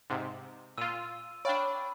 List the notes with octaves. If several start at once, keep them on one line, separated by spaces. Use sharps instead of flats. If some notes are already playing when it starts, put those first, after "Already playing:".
G#2 C3
A#2 F4 E6 D#7
D4 C#5 D5 F5 G5 B5